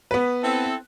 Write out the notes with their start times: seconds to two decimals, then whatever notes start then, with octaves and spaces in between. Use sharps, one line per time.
0.11 B3 B4
0.43 C4 E4 A4